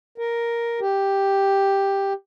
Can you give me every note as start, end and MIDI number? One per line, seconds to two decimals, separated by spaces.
0.18 0.80 70
0.81 2.13 67